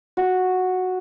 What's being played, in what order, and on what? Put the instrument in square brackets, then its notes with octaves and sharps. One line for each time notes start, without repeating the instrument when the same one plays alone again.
[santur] F#4